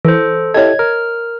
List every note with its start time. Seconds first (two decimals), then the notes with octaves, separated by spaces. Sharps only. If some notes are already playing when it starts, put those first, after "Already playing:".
0.05 E3 A4 C5
0.54 E4 G4 A4 C#5 D#5 G#6
0.79 A#4 F6